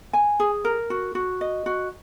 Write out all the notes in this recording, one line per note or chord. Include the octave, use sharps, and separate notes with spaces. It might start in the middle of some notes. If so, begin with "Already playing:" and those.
G#5
G#4
A#4
F#4
F#4
D#5
F#4